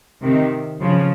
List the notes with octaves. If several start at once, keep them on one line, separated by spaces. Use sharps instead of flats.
C3 D#3
C#3 F3